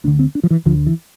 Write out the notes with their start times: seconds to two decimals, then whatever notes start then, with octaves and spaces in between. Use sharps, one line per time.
0.04 D2 D4
0.07 D3
0.19 C4
0.35 D4
0.43 F3
0.50 E3
0.65 D2 D3 F3
0.86 E3